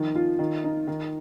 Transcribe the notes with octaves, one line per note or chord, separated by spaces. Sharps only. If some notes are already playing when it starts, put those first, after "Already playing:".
Already playing: D#3 F3
F4
D#3
D#4
D#3